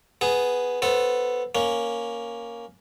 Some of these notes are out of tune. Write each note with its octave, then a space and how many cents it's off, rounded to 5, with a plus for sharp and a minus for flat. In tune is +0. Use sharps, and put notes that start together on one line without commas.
B3 +0 G#4 +0
B3 +0 A4 +0 C5 +15
A#3 +5 C#4 +0